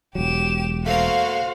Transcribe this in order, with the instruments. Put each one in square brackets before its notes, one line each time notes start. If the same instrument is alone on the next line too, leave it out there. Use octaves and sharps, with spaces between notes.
[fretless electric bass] E1 F#3 [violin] G4 E7
[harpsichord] A3 A#3 [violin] F#4 C5 [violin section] F5